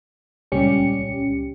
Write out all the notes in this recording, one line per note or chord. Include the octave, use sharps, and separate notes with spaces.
C#2 A#2 G3 C#4 G4 C#7